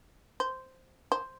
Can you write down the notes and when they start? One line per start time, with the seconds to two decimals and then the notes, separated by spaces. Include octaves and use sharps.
0.40 C5
1.12 C5